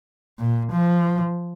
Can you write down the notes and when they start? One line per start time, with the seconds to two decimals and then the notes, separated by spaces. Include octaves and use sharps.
0.40 A#2
0.73 F3